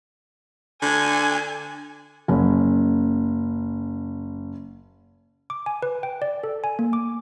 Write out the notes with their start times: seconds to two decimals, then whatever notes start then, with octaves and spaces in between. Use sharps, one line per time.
0.82 D3 G#5
2.28 F#1 C#4
5.50 D6
5.66 G#5
5.82 B4
6.03 G5
6.22 D5
6.44 A4
6.64 G#5
6.79 A#3
6.93 D6